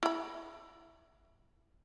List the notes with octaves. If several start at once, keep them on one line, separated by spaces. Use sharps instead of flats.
E4 B5